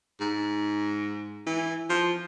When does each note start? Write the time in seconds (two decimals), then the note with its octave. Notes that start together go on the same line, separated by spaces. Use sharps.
0.20 G#2
1.46 E3
1.89 F3